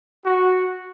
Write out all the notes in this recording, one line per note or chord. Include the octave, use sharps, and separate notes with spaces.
F#4